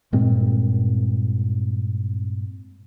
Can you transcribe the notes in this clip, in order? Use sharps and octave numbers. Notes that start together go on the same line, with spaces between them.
G2 A#2 G#3 C4